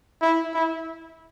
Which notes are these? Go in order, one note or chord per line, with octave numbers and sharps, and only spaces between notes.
E4
E4